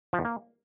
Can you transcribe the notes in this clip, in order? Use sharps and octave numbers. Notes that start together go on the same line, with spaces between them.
F3
E2
A#3